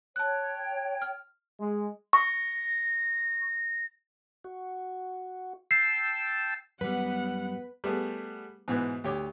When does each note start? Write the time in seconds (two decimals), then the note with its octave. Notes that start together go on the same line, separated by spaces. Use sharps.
0.16 C#5 G5 A5 F#6
1.02 F6
1.59 G#3
2.13 C#6 A#6
4.44 F#4
5.71 G5 A5 E6 C7
6.81 F#2 G3 B3 B4 F#5
7.84 G3 A3 B3 G#4
8.68 G#2 B2 E3 B3
9.04 D2 G4 C#5 D6